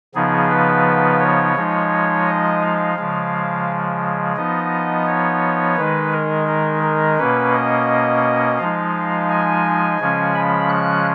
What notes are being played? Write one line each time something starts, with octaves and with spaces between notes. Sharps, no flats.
C#3 F3 B3 D#4 G#4
B4
C#5
F3 G#3 D#4
D#5
F5
C#3 F3 G#3
F3 B3 D#4 D#5
C#5
D#3 G#3 D#4 B4
A#4
A#4
A#4
B2 A#3 C#4 B4
D#5
F3 G#3 D#4 F5
G#5
C#3 F3 G#3 C#4
B5
F#6